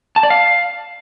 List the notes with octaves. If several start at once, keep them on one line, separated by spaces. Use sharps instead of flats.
A5
D5
F5